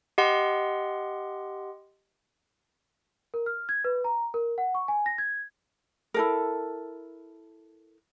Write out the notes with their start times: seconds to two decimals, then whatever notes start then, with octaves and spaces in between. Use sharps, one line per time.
0.18 G4 D#5 F#5 C6
3.34 A#4
3.46 F6
3.69 G#6
3.84 B4
4.04 A#5
4.34 A#4
4.58 F#5
4.75 C#6
4.88 G#5
5.06 A#6
5.18 G#6
6.14 E4 A4 A#4